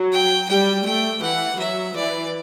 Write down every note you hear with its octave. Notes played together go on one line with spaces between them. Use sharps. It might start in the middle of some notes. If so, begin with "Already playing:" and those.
Already playing: F#3
G5
G3 G5
A3 G5
E3 F#5
F#3 E5
E3 D5